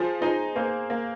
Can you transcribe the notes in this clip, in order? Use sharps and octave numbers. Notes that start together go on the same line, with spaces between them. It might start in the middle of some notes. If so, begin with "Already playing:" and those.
Already playing: F3 G#4 C5
D#4 G#4 C5
A#3 G#4 C5
A#3